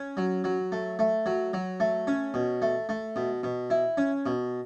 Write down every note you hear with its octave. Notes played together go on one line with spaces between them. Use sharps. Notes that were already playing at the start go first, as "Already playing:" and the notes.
Already playing: C#4
F#3
F#3
A3
A3
F#3
F#3
A3
C#4
B2
A3
A3
B2
B2
E4
C#4
B2